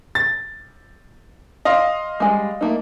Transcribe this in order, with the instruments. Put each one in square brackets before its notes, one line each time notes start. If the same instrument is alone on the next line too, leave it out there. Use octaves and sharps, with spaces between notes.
[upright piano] A6
D#5 F5 C6
[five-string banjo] G3 G#3 A#3
A3 A#3 D#4